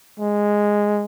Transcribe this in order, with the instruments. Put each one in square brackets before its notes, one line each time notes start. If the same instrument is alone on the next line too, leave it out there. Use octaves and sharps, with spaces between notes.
[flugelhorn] G#3